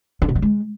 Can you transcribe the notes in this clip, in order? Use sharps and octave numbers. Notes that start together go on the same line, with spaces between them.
D3
B2
D#3
G#3